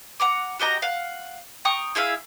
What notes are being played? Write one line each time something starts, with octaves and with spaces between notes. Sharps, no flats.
F#5 A#5 D6
F#4 G4 D#5 A#5
F5 F#5
G5 A#5 C#6 D#6
E4 G#4 E5 F5